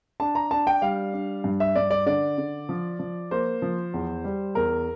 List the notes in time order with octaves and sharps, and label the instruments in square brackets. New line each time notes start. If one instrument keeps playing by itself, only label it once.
[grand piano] D4 A5
A#5
D4 A5
G5
G3 F5
D4
G2
E5
G2 D5
D5
D3 D5
D3
F3
F3
A#3 C5
F3
E2
G3
E2 A#4